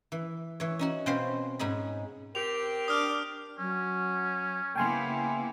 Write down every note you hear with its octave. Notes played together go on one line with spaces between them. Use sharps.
E3
E3 C#5
C#4 D#4 F#4
B2 C4 C#4 C5 F5
G#2 C#4 D#4 G#4 B5
C4 G4 A#4 F7
D4 D6 D#6 F6
F#3 C#4
C#3 A#3 B3 E4 G5 G#5 C6